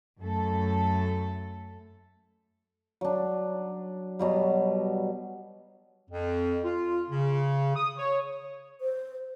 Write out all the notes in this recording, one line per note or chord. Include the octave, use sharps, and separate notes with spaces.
F#2 A3 A4
F#3 D4
B2 F#3 G3
F2
F4
C#3
D#6
C#5
C5